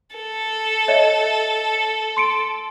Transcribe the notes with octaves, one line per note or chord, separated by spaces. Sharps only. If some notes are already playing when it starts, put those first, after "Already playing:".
A4
C#5 D#5 E5
C6 C#7 D7